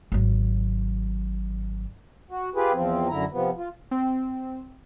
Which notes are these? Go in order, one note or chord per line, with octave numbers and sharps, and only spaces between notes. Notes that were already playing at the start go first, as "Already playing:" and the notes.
G#1 F#3
F#4
F4 G4 G#4 B4
E2 F3 C4
F#2 D3 E4 A#5
C3 F3 B3
F4
C4